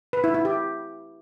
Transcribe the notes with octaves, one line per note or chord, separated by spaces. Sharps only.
B4
E4
E4
G4